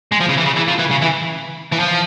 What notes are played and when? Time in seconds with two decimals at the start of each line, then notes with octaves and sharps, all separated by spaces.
0.12 G#3
0.20 F3
0.29 C#3
0.38 E3
0.45 C#3
0.57 E3
0.68 F3
0.79 E3
0.91 C#3
1.02 E3
1.73 E3
1.80 F3